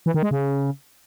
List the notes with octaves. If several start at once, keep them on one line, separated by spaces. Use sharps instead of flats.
E3
D#3
G#3
C#3